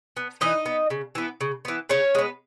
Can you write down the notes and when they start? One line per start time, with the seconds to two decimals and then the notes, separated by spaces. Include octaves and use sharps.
0.17 B3
0.41 E3 D#4 D#5
0.66 B3
0.90 C#3
1.15 E3 B3
1.41 C#3
1.65 E3 B3
1.89 C#3 C#4 C#5
2.15 G#3 B3